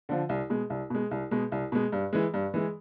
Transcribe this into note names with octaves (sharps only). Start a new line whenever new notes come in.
D3 F3
C2
B2 G#3
C2
B2 G#3
C2
B2 G#3
C2
B2 G#3
G2
E3 G#3
G2
E3 G#3